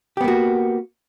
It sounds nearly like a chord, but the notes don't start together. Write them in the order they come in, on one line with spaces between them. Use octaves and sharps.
G4 B3 A#3 F#4